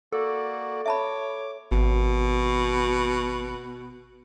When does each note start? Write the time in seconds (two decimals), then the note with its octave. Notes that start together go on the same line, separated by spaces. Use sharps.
0.13 A#3 F#4 A4 D5
0.86 C#5 E5 A5 B5 D6
1.72 G#1 B2